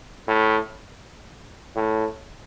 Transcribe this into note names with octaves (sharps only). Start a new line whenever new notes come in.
A2
A2